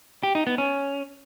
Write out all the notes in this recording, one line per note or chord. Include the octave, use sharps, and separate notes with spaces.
G4
D#4
B3
C#4